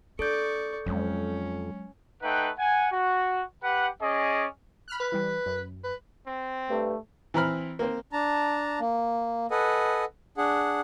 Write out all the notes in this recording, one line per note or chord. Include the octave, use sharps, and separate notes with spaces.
D4 A4 D5 C#6 G6
F2 F#3 G#3 C#4
A3 D#4 B4 F#5 G5
F#5 G#5
F#4
G4 B4 F#5
C#4 G#4 D5 D#5
B5 F6 F#6
B4
E3 G3
F#2
B4
C4
G2 A3
E3 C4 A#5 B5 F6
A#3 C4 C5
D4 A5 A#5
A#3
A4 B4 D#5 F#5 G#5
D4 G#4 F#5